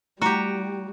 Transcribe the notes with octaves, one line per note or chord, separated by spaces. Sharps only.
G3 A3 E4 F#4 G4 A#5